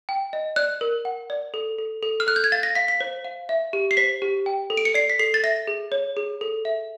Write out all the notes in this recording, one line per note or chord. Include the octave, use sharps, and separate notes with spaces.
G5
D#5
D5 F#6
A#4
F#5
D5
A4
A4
A4
F6
A4 F#6
G6
G#6
F5 A6
A#6
F5 B6
B6
C5
F5
E5
G4
C7
C5 B6
G4
G5
A4
D7
C#7
D5 C7
B6
A4 C7
A6
E5 A#6
G#4
C#5
G#4
A4
E5